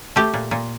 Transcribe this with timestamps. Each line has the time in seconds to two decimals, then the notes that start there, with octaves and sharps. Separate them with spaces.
0.16 A3 G4
0.34 A#2
0.51 A#2